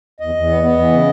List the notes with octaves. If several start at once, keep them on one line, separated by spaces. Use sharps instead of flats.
E2 D#5
E2
B3
B3
E3
C#3